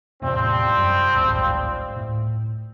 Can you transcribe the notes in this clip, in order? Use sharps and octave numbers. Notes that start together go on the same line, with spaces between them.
E2 A2 C3 F3 G3 C4
F#2
A1 D2 G#2
A2